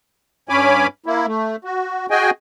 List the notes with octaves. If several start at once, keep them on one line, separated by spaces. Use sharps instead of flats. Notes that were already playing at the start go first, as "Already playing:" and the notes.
G2 C#4 C#5 G#5 B5 D6
A#3 E4
A3
F#4
F#4 G#4 D#5 G5 G#5